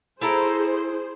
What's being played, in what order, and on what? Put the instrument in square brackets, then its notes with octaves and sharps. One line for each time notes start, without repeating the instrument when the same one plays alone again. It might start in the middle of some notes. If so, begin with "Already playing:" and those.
[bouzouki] E4 A4 A#5 [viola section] G#4 C5